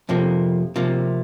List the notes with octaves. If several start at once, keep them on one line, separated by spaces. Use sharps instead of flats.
F2 C3 F3 A#3
C3 F3 A#3